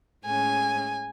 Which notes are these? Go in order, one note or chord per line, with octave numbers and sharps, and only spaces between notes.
A2 G#3 C#4 G#5